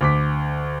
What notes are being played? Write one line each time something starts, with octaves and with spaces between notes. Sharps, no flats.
D2 D6 B6